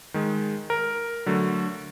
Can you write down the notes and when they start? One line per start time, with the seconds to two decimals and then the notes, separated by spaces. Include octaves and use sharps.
0.14 D#3 G#3
0.70 A#4
1.26 D3 F#3 A3